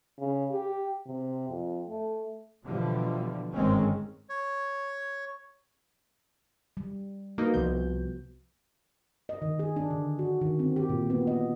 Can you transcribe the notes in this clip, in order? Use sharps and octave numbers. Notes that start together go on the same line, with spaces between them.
C#3
G4
C3
F2
A3
B2 D3 E3 F3 G3
G1 G#2 D#3 G#3 C4 C#4
C#5
G3
A#3 D#4 F#4 B4
C2 C3 F3 B3 G6
D#5
D#3
G#4
D4
D3
F#4
D#3
C4
G4
A#2
B3
D#5